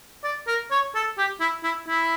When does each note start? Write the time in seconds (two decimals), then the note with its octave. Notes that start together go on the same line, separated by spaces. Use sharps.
0.24 D5
0.47 A#4
0.71 C#5
0.95 A4
1.18 G4
1.40 E4
1.63 E4
1.88 E4